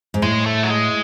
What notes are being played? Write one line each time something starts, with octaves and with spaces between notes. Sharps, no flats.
G#2
A2 G#3
A3
F#3
G#3